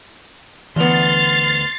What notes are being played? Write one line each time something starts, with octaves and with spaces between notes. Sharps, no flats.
D2 E3 B3 C6 F6 A6 C7